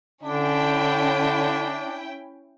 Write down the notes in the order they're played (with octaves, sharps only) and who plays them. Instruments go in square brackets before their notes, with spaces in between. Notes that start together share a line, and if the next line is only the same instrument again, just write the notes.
[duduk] D3 [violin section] C#4 E4 G5 [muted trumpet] D4